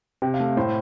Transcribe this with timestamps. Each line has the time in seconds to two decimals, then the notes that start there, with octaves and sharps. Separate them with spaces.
0.22 C3 G5
0.34 F5
0.40 A3
0.57 A2 C5